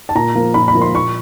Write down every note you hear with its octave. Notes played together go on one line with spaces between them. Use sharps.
A5
A#2 A#5
F3 A#3
A#2 B5
B5
F3 A#3
C6
A#2 C#6